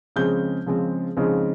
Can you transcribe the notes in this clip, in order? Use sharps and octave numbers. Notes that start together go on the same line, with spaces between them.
C#3 F3 G#3 C4 G6
C#3 F3 G#3 C4
C#3 F3 G#3 C4 D#4